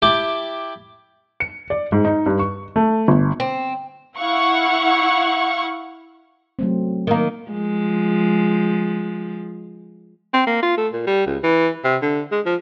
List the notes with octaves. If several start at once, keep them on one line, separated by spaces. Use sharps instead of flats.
E4 G4 G5 A5 D6
C#7
D5
G#2
D#4
G2
C#6
A3
G1
C4
E4 F5 F#5 C#6
F#3 A3 C4
D#3 A#3
F3 G#3
C4
A#3
F4
A3
A#2
G3
C#2
E3
C3
D3
G#3
F3